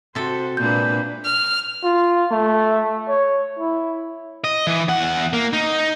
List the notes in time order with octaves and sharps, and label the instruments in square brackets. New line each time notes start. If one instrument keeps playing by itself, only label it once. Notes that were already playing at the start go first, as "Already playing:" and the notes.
[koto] C3 A4 [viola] F#4 C5
[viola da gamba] A#2 A#3 D4 [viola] G#3 B4 [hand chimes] G6
[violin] F6
[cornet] F4
A3
C#5
E4
[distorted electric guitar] D#5
E3
E2 F#5
A#3
D#4